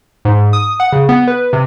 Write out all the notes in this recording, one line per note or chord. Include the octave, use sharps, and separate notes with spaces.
G#2
D#6
F#5
C#3
B3
B4
C3